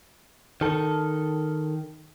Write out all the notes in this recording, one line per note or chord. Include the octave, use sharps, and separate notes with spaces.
D#3 A4